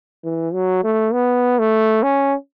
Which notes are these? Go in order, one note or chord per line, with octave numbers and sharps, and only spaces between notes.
E3
F#3
A3
B3
A3
C#4